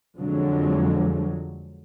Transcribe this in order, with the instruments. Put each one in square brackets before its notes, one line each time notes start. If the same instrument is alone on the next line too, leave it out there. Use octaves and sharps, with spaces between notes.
[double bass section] F2 D3 F3 F#3 G#3